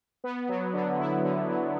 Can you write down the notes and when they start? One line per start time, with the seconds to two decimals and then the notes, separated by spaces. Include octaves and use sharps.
0.24 B3
0.49 F#3
0.73 D3
0.98 E4
1.23 D3
1.48 F#3